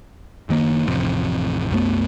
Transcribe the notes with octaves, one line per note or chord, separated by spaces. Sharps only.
F#1 D#3 A#3
A1 F2 C3
C2 F#2 A3 B3